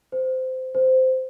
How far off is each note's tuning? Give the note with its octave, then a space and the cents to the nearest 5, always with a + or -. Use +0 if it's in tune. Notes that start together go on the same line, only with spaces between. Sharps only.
C5 -20
C5 -15